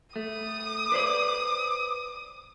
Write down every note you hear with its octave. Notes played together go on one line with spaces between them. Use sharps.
A3 D#6
B4 C5 D5